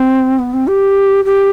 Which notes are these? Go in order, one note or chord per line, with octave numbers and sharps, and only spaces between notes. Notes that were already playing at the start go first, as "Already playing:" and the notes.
Already playing: C4
B3
C4
G4
G4